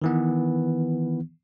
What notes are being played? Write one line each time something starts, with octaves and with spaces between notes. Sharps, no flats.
D#3 E3 B3